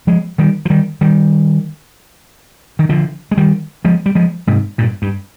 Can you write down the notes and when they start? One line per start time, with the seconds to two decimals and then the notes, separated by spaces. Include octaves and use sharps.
0.07 F3 G#3
0.38 D#3 G3
0.65 F3
0.70 D#3 G3
1.01 D#3 G3
2.79 D#3
2.89 D3 F3
3.31 G#3
3.37 D#3 G3
3.85 F3 G#3
4.06 G3
4.15 F3 G#3
4.47 G#2 C3
4.78 G2 A#2
5.02 G2